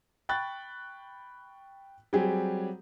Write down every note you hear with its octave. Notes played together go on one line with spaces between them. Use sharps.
G5 B5 C#6 F#6 A6
F#3 G3 C4 G4 G#4